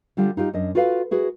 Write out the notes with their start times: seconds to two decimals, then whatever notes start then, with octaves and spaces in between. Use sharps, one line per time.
0.17 D3 G3 F4 G4
0.37 D#4 F4 G4
0.53 F#2 D4 D#5
0.75 F4 F#4 A4 B4 F5
1.11 E4 F#4 G#4 B4